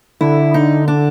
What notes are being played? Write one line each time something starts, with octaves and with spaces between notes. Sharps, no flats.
D3 E4
D#4
D4